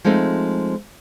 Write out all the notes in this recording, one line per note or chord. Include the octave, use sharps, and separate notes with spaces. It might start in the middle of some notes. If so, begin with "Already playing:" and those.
F3 G#3 A3 C4 D#4